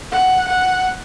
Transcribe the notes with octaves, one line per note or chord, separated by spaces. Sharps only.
F#5
F#5